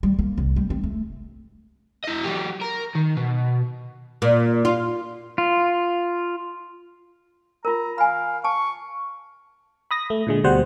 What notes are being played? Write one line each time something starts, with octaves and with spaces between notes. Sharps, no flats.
G3
A#3
C2
G3
C4
A3
E4 D#5
F#3 G4
A#4
D#3
B2
A#2
F4
F4
F4 A#4 A#5
F5 G#5 B5
A5 C#6
B5 D#6 A#6
A3
A#2 D3 G#3
D2 B2 G3 C5 F#5